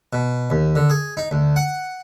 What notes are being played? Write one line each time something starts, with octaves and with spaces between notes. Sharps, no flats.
B2
D#2
D3
G#4
D#4
D2
F#5